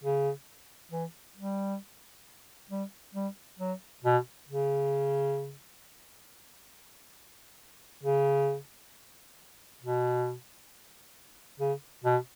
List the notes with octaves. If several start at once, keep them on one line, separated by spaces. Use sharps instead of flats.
C#3
E3
G3
G3
G3
F#3
B2
C#3
C#3
B2
C#3
B2